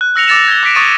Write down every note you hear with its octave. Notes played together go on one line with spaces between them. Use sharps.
F#6
E6 A#6 C#7 F7
D6 E6 A6 A#6 C#7 E7
G#6 A6 G7
D6 F#6 B6 D7
C#6 D#6 A6 D7 D#7